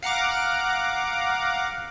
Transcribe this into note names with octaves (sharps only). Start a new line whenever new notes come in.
F5 F#5 A#5 D6